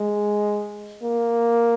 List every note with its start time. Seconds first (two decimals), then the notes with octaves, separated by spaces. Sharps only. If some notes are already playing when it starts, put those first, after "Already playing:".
Already playing: G#3
1.03 A#3